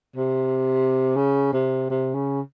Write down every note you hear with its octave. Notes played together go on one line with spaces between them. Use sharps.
C3
C#3
C3
C3
C#3